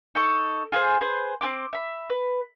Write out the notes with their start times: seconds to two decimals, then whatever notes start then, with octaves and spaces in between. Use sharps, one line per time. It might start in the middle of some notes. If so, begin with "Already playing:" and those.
0.15 D#4 A4 C#6
0.72 F4 G#4 A4 C5
1.01 G#4 B4 C5 C6
1.41 C4 G4 C6 D6
1.73 E5 B5
2.10 B4